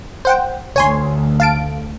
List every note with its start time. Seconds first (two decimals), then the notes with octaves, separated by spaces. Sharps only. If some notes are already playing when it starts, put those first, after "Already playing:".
0.25 C5 F#5 G5
0.76 D2 A3 C#5 G#5 C6
1.40 F5 A5 D7